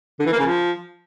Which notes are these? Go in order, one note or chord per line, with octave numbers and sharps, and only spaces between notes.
D3
E3
A#3
C#3
F3